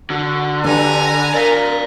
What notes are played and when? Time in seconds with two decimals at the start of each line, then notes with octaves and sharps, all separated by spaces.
0.10 D3 F#4
0.64 D4 G4 A4 B4 G#5 A#5
1.34 A#4 D5 F5